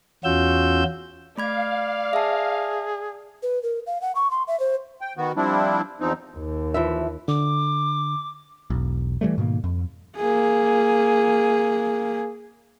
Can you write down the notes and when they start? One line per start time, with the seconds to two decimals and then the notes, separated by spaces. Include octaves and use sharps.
0.24 E2 C#4 F4 F#4 E6 G6
1.38 A3 D5 F5 B5 G#6
2.13 G#4 E5 A5
3.43 B4
3.63 A#4
3.87 F5
4.02 F#5
4.15 C#6
4.31 C6
4.48 E5
4.60 C5
5.01 G5
5.17 D#3 B3 F#4
5.37 F3 G3 C4 D4 E4
6.00 E2 F3 C4 D#4
6.37 D#2
6.74 E3 F3 E5
7.28 D3 D6
8.70 E1 B1
9.21 E3 F#3 G3 A3
9.38 G#2 B2 D#3 A#3
9.64 F2
10.17 A#3 G#4